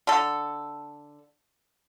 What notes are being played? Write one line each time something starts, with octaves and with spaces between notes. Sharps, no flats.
D3 A4